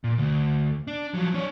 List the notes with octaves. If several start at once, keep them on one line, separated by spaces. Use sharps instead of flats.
A#2
D2
D4
F3 F#3
D4 C#5